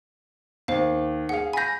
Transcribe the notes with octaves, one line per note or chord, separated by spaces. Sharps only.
D#2 C5 F5
G#4 F5 F#5
G#5 B5 G6 A#6